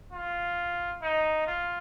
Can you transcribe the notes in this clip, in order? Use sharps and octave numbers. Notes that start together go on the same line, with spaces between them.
F4
D#4
F4